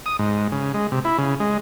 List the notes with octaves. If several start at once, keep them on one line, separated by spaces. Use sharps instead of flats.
D#6
G#2
C#3
G#3
C3
E4
C#3
G#3